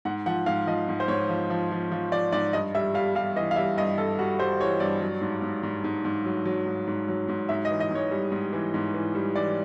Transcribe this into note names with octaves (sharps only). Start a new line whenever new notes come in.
G#2 F#5
F3 F#5
G#2 F5
F3 D#5
G#2
C5
G#2 C#5
F3
F3
F3
F3
F3 D5
G#2 D5
G2 D#5
G3 E5
G3 F5
G3 F5
E3 D#5
F5
G3 E5
G2 D#5
G2 A4
G3 F#4
G3 C5
E3 C#5
G2 D5
F#3
G#2
G#2
G#2
G#2
G#2
F#3
F#3
G#2
G#2
F#3
G#2
G#2 E5
D#5
E3
D#5
G#2 C#5
G3
G#2
E3
G#2
E3
G3
E3 D5